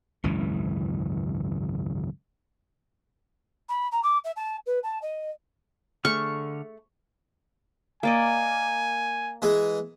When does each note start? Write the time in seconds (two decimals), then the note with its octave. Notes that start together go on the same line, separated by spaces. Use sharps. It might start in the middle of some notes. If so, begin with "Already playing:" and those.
0.24 G#1 C#2 F#2 E3
3.69 B5
3.92 A#5
4.03 D6
4.24 E5
4.36 A5
4.66 B4
4.83 A5
5.02 D#5
6.05 D3 A3 G#4 C#6 F6
8.03 A#3 D5 D#5 G#5
9.42 E3 G#3 G#4